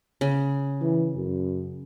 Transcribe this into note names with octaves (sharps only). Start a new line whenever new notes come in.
C#3
E3
F#2